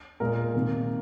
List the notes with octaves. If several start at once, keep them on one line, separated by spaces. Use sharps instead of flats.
A#2 G#3 A#4
C3 D#3 A#3